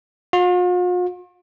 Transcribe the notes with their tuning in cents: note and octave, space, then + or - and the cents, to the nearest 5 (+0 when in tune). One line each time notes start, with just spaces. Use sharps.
F4 +45